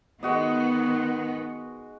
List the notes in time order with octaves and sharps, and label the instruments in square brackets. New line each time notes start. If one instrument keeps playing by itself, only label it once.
[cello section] D#3 B3 [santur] G#3 F#4 D#5